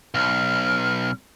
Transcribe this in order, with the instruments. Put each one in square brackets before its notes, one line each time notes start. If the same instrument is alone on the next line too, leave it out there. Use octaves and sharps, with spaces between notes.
[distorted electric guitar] B1 [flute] F6